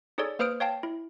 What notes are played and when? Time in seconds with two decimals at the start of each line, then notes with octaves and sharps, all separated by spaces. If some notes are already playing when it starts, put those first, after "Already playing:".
0.18 D#4 G#4 A4 C#5 D5
0.39 A#3 B4 C5 D#6 F6 D7
0.60 C#5 F5 G5 A5
0.83 E4